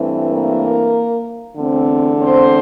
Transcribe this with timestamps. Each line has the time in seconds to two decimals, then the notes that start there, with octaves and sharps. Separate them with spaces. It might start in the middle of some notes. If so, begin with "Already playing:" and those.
Already playing: G2 E3 A3 C4
0.31 A#3 A#4
1.56 E2 D3 A3 C4
2.18 C4 C5